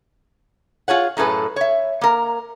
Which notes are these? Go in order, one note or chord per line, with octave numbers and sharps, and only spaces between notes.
F4 G#4 C#5 F#5
F#2 A2 G#4 A4 B4
C#5 E5
A#3 A#4